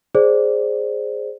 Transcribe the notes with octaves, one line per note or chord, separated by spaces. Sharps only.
G#4 C5 D5